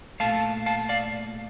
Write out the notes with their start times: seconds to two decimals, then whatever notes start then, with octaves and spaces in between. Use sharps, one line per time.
0.20 A#2 A3 F5 A5
0.66 F5 A5
0.89 D5 F5